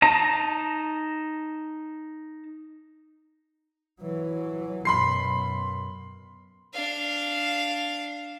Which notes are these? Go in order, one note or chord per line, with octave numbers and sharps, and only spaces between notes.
D#4 A5 A#5
E3 F#3
F#2 B2 B5 C6 C7
D4 F5